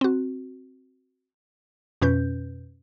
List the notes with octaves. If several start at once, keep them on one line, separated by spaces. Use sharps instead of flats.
C4 F#4
F2 B2 C#4 B4 G6